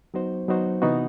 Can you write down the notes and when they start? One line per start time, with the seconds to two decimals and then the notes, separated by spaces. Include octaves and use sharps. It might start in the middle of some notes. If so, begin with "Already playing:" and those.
0.14 F#3 B3 D#4 F#4 C5
0.48 F#3 B3 D#4 F#4 C5
0.82 C3 E3 B3 D#4 F#4